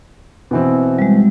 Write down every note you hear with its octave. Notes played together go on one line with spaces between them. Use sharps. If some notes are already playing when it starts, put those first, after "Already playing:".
B2 E3 C4
G3 G#3